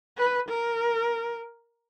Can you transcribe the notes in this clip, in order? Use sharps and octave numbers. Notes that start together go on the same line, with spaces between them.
B4
A#4